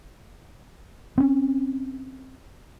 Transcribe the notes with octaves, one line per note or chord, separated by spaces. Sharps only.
C4 C#4